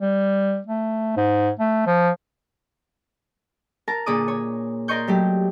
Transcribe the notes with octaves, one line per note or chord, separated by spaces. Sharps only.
G3
A3
G#2
A3
F3
A#4 A5 A#5
A#2 D3 G#4 D6 D#6
C#5
A#4 D5 D#5 C6 C#6 G6
F#3 A3 G4